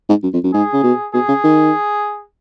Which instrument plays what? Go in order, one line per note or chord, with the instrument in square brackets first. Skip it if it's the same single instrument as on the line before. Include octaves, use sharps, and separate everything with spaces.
[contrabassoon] G#2
F#2
F2
F#2
[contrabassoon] G#2 [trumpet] G#4
[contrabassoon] C#3
B2
[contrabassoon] B2 [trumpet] G#4
[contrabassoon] C#3
D#3